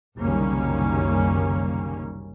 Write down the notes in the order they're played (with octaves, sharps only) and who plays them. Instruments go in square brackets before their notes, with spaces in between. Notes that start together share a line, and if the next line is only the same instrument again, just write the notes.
[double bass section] F#1 C2 D#3 G3 A#3 C#4